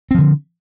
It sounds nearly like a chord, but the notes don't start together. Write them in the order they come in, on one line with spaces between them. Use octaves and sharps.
C4 F3 D3